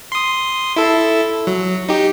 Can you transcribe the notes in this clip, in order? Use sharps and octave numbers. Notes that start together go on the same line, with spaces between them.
C6 D#6
E4 A4
F#3
D#4 G4